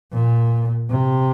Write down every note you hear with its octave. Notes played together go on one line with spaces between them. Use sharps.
A#2
C3